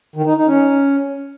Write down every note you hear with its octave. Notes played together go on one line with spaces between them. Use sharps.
D#3
D#4
D#4
C#4